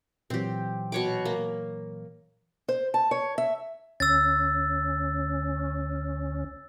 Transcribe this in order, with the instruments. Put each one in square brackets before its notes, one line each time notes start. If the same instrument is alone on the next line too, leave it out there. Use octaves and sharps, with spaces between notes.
[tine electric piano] A#2 E3 F#3 [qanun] C4 G4
[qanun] B2 C#5 D6
A#3
[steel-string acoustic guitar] C5
A5
C#5
E5
[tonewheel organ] D2 C#4 [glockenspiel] E6 A6